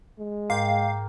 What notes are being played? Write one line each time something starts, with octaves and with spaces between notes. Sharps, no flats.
G#3
G#2 A#3 F5 G5 A#5